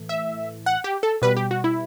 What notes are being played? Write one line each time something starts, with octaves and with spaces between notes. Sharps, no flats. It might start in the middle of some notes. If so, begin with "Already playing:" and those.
Already playing: A2 E3 A3
E5
F#5
G4
A4
B2 G3 B4
G4
F#4
E4